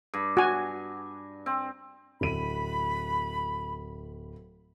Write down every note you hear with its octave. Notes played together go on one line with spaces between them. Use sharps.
G2
F#4 G#5
C4
D1 B5 D#7